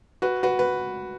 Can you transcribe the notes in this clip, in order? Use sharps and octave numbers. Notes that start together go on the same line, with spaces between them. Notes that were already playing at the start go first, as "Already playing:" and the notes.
F#4 B4
F#4 B4
B4